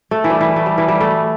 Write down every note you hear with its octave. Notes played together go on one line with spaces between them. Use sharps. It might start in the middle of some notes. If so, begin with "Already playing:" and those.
A3
E3
G3
E3
A3
G3
E3
G3
A3